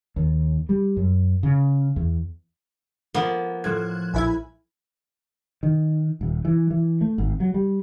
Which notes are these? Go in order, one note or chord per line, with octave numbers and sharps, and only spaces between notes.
D#2
G3
F#2
C#3
E2
F3 A#3 B3
A2 F3 F#6 G#6
A#1 E4 G#5 B5 G#6
D#3
D#1
E3
E3
A3
G#1
F#3
G3